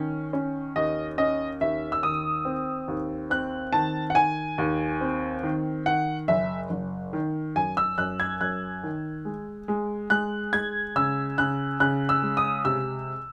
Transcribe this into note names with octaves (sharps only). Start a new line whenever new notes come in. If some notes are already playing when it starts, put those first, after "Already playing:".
Already playing: D#3 C#4
C#4
D#2 D#5
C#4 D#5
D#2 E5
E6
D#3 D#6
C4
D#2
C4 F#6
D#3 A5
F#5
D#3 G#5
D#2
C4
D#3
D#3 F#5
F#1 E5
F#1
D#3
F#2 G#5
E6
F#2 F#6
G#6
F#2 F#6
D#3
G#3
G#3
G#3 F#6
G#3 G#6
C#3 E6
C#3 F#6
C#3 F#6
E6
G#3
D#6
C3 E6